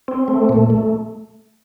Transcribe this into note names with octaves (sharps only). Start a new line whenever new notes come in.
C4
A3
A#2
A3